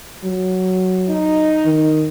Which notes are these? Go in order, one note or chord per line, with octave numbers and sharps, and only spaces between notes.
F#3
D#4
D#3